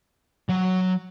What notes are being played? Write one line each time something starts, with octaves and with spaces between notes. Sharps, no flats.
F#3